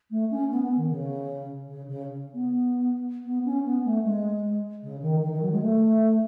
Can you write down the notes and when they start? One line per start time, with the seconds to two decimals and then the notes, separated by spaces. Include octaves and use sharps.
0.11 A3
0.30 C#4
0.51 B3
0.63 B3
0.76 D#3
0.90 C#3
1.68 C#3
1.88 C#3
2.34 B3
3.25 B3
3.45 C#4
3.65 B3
3.85 A3
4.04 G#3
4.83 C#3
5.02 D#3
5.21 D#3
5.32 D#3
5.42 F#3
5.51 G#3
5.61 A3